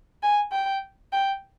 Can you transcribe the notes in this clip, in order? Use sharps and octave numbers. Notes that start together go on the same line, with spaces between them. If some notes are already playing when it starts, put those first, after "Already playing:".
G#5
G5
G5